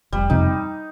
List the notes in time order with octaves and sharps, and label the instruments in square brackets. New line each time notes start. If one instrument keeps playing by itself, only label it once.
[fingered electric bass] F1 [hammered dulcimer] G3
[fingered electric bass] F2 C3 [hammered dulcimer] D#4